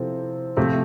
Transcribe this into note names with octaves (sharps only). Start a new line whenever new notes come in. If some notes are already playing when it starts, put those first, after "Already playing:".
Already playing: C3 F3 C4 E4 A4
C3 F3 A3